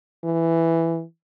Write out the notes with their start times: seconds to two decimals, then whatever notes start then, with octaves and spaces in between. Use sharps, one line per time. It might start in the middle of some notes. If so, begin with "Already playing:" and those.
0.24 E3